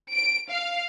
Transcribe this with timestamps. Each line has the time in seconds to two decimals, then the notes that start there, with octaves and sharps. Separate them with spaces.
0.15 D7
0.51 F5